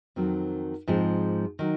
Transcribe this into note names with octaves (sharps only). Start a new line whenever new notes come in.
F2 D#3 F#3 C4
G#2 F3 G#3 C4
D#3 F#3